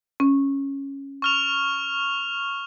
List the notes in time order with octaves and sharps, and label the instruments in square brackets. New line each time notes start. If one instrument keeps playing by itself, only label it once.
[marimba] C#4
[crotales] C#6 F6 F7